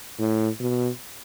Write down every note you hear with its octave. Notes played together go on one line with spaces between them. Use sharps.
A2
B2